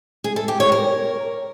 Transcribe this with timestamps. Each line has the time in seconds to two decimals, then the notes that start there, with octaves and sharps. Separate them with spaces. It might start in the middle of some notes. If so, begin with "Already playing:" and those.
0.24 G#4
0.36 A4
0.48 G4
0.60 C#5
0.72 A#4